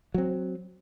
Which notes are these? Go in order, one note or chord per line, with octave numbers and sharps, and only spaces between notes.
F#3 C4